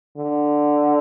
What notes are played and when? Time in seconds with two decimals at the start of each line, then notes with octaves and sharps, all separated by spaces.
0.17 D3